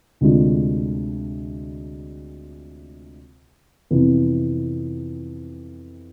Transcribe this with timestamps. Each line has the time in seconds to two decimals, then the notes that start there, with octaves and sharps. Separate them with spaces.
0.21 D2 C3 G#3 D4 F4
3.90 F2 C3 E3 B3